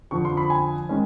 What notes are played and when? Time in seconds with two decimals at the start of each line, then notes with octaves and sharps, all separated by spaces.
0.11 F2 D3 F3 C#6
0.25 C6
0.37 B5
0.50 G#5
0.89 D#3 G#3 C#4